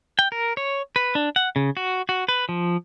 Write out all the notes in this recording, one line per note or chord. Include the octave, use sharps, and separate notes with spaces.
G5
A#4
C#5
B4
D4
F#5
C#3
F#4
F#4
B4
F3